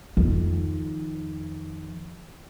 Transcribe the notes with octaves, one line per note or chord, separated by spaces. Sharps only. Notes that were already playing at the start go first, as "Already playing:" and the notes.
F2 D#3